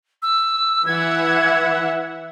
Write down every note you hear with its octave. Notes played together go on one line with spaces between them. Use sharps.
E6
E3 E5 F#5 G#6